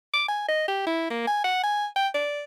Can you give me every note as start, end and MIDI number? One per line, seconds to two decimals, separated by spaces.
0.14 0.27 86
0.28 0.45 80
0.48 0.67 75
0.68 0.84 67
0.86 1.05 64
1.10 1.24 58
1.27 1.41 80
1.44 1.60 78
1.63 1.86 80
1.96 2.08 79
2.14 2.43 74